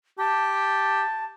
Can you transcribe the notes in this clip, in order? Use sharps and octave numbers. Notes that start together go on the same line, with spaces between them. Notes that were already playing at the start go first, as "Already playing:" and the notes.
G4 A5